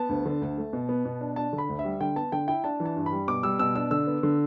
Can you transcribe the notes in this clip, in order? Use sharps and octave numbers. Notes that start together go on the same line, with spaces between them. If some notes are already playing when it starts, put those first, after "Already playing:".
Already playing: B3 A5
D2
D3
D2
A3
B2
B3
B2
D4
D4 A5
D3
B5
D2
E5
G3
D3 G5
B3 A5
D3 G5
E4 G5
D4 A5
E3
A5
G2
B5
G3
B2 D6
G3 E6
B2 E6
D4 E6
D3 E6
B3
D3